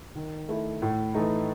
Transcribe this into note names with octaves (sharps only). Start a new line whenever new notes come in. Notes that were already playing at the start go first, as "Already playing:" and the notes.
D#3
A3 E4
A2
E3 A3 D#4